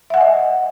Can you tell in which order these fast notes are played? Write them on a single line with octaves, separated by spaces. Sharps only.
E5 F#5 G#5 D#5